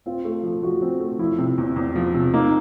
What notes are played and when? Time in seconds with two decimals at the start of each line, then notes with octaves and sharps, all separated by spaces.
0.06 C4 F4
0.25 A3
0.44 F3
0.63 F3 F#4
0.82 C4
1.00 A3
1.19 F3 E4
1.38 C3
1.58 E2
1.76 E2
1.96 F3
2.14 C3
2.34 A#3 D#4